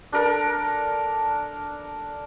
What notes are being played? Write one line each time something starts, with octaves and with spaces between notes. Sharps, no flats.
D4 A4 A#4